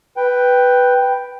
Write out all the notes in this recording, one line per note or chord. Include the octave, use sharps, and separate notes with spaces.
B4 G5